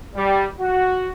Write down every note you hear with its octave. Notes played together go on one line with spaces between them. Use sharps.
G3
F#4